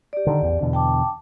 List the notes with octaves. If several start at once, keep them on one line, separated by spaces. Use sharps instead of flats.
G4 D5
D3 D#3
A1 E2
E2 B2 D3
G5 A5 D6